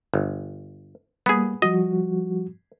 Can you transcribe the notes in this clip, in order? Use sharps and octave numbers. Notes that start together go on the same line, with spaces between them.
G1
G3 A#3 B3 G#4
F3 G3 F#4 D#5